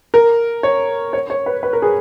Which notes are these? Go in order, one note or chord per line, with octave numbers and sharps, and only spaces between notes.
A#4
C#5
C#5
C#5
B4
B4
A#4
G#4